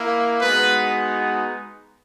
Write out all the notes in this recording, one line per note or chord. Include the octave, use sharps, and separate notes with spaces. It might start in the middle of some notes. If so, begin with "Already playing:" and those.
Already playing: A#3 E4
G#3 B3 D#4 F#4 B4